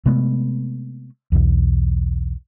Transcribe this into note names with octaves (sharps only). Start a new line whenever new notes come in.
C3 G#3 A3 B3
B1 E2